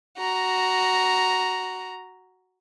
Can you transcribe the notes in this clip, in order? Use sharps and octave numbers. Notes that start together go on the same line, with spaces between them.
F#4 A#5